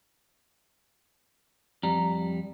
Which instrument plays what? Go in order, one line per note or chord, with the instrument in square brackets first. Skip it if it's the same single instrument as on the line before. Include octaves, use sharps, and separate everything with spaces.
[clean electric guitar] F2 G3 [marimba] A#5